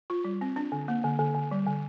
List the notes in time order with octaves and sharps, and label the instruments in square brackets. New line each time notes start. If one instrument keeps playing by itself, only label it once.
[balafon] F4
G3
C4
D4
D3
A#3
D3
D3
D3
G3
D3